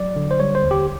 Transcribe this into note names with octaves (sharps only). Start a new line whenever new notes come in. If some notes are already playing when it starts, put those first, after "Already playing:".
Already playing: F#3 D5
D3
C5
G3 C#5
C5
D#2
G4